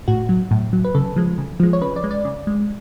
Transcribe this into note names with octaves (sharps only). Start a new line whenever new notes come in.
A2 F#4
F#3
A2
F#3
B4
C#3 A4
F3 G#3
C#3
F3 G#3
C#5
C#3 B4
D5
G#3
D5
C#3
G#3